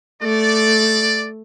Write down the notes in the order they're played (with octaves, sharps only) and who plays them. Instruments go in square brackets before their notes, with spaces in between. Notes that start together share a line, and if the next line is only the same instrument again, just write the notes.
[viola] A3 [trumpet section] D5